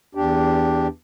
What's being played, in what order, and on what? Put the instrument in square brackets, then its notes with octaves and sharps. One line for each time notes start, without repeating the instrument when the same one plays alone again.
[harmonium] E2 D4 G4